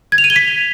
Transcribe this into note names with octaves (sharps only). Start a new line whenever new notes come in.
G#6
F7
D#7
G7
B6